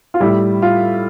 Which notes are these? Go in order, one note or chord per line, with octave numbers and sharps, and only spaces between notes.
F4
A2 G3 E4
F4